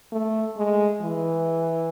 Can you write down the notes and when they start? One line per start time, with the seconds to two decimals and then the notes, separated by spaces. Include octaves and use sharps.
0.12 A3
0.57 G#3
1.01 E3